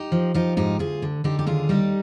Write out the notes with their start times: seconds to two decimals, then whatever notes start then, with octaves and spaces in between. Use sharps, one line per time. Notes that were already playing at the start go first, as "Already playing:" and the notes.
Already playing: D#4 G4
0.12 F3
0.34 F3 D#4 G4
0.57 G#2 D#4 G4
0.79 D2 F4 G#4
1.02 D3
1.24 D3 D#4 G4
1.39 G4
1.46 D#2 F4 G#4
1.69 G3 D#4 G4